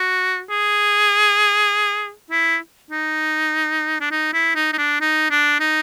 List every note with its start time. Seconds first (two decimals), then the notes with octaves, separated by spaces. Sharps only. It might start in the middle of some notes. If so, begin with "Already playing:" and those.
Already playing: F#4
0.50 G#4
2.30 E4
2.91 D#4
4.00 D4
4.11 D#4
4.33 E4
4.55 D#4
4.73 D#4
4.78 D4
5.01 D#4
5.31 D4
5.60 D#4